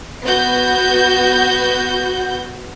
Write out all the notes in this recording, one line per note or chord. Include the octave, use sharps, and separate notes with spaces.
B3 F#4 G6